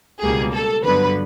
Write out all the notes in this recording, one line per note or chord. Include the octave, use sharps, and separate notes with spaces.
C#2 B2 G3 A#3 G#4
A4
G2 D3 F#3 B3 B4